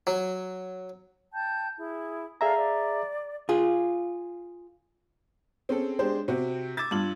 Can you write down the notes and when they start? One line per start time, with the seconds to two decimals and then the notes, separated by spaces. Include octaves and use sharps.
0.07 F#3
1.32 G5 A5 G6
1.77 E4 G#4
2.41 G#4 A4 D5 E5 F5 A#5
2.56 D5
3.49 F4 G#4
5.69 C4 C#4 G#4 A4
5.99 G#3 D4 G4 G#4 C5
6.28 C3 C4 F#4
6.77 D6 E6 G#6 A6
6.91 G2 F4 F#7